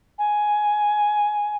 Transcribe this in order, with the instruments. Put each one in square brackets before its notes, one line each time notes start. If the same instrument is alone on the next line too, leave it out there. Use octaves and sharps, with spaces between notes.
[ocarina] G#5